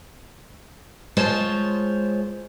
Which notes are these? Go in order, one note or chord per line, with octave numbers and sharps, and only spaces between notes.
G#3 F4 C5 C#5 A5